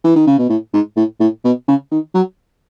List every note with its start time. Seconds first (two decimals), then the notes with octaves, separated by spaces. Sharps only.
0.04 E3
0.16 D#3
0.27 C#3
0.39 B2
0.50 A2
0.74 G#2
0.96 A2
1.20 A2
1.45 B2
1.68 C#3
1.92 D#3
2.14 F#3